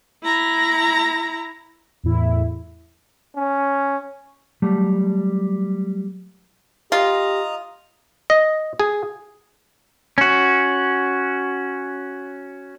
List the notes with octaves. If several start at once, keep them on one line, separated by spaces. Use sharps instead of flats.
E4 A#5
E2 A2 E4
C#4
F#3 G3 A3
F4 G4 D#5 A#5
D#5
G#4
C#4 F#4